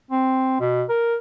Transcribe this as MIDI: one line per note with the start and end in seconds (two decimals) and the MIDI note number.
0.11 0.60 60
0.60 0.84 47
0.89 1.16 70